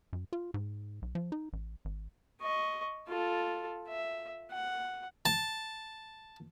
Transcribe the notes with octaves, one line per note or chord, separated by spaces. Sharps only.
F#2
F4
G#2
B1
F3
D#4
A1
G#1
D#5 C#6
F4 A4
E5
F#5
A5